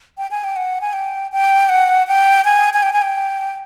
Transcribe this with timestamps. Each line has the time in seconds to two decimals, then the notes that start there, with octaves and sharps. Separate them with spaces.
0.18 G5
0.31 G#5
0.44 G5
0.56 F#5
0.81 G#5
0.93 G5
1.32 G5
1.69 F#5
2.07 G5
2.45 G#5
2.73 G#5
2.83 G5
2.93 G#5
3.02 G5